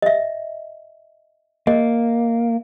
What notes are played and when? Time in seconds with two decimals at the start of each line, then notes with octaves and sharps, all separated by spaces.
0.02 D#5 E5
1.67 A#3 D#5